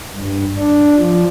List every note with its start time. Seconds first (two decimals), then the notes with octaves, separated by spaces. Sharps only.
0.15 G2
0.58 D4
0.98 F3